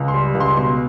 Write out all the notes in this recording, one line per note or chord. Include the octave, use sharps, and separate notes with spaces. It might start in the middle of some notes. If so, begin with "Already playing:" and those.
Already playing: C#2
C6
G3
C#2
C6
B2 C6